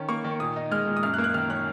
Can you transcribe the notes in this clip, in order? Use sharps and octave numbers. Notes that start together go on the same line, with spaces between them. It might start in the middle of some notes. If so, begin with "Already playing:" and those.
Already playing: D#3 C#4
A#3 C#6
D#3
A#2 D#6
D#4
G#3 F6
A#2
D#6
F#2 F6
F#6
A#3
F#6
D#3 F6
C#4 F#6